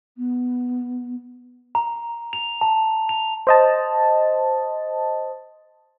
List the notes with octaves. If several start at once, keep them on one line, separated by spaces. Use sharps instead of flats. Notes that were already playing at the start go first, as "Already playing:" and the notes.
B3
A#5
F7
A5
F7
C5 D#5 A5